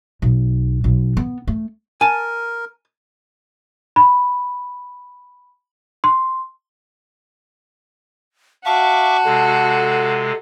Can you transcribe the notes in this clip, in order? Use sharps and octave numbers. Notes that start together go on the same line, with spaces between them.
B1
B1
B3
A3
A#4 G#5 A5
B5
C6
F#4 E5 F5 A5 C#6 D6
C3 G#3 A4